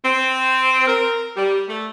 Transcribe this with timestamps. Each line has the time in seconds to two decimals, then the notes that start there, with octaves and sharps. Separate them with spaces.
0.05 C4
0.88 A#4
1.37 G3
1.69 A3